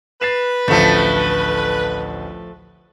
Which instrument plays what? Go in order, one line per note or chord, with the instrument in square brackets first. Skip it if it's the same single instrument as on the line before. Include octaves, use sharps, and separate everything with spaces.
[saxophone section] B4 [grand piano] A6 C7 E7
[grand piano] A1 D2 [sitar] F3 A3